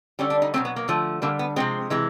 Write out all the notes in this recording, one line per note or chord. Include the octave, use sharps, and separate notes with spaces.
D3 G3 C#4
D4
D#4
B2 F#3 A3 C4
B3
A#3
D3 F3 A3
D3 G3 A#3
B3
C3 F3 G#3 C4
C3 E3 G#3